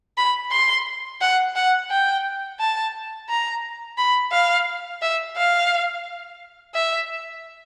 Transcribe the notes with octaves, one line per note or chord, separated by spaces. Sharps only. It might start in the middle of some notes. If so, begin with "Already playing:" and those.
B5
C6
F#5
F#5
G5
A5
A#5
B5
F5
E5
F5
E5